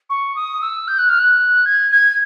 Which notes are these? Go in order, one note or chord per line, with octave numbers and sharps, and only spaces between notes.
C#6
D#6
E6
G6
F#6
F6
F#6
G#6
G#6